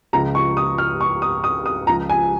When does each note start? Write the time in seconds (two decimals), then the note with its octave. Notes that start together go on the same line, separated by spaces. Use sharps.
0.13 C#2 C#3 F3 A#5
0.35 C#6
0.57 D#6
0.78 F6
1.01 C#6
1.22 D#6
1.44 D#6
1.66 D#6
1.87 C#2 C#3 F3 A#5
2.10 G#5